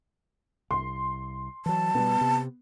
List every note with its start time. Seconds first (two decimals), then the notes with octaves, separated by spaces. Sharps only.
0.71 C2 C6
1.66 E3 F#3 A5
1.95 B2 G3 B3
2.21 C3